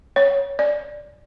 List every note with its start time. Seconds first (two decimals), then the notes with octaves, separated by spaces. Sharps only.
0.16 C#5
0.59 D5